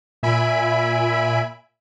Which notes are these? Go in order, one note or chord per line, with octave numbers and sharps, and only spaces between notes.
A#2 E5 G#5 B5 D7